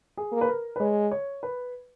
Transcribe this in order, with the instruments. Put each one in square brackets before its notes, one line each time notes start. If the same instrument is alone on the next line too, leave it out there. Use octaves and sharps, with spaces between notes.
[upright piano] G#4
[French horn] A#3
[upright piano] B4
A#4
B4
[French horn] G#3 [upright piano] C#5
[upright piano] C#5
B4